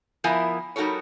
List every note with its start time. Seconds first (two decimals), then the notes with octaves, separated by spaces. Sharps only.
0.24 F3 B3 E4 A#4 E5 G#5
0.76 G3 D#4 F#4 A4 A#4 C#5